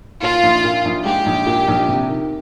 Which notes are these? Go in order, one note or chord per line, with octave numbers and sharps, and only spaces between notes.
A#2 F4
A#1
A#2
A#1
G#3 G4
A#1
A#2
A#1
C3
D#3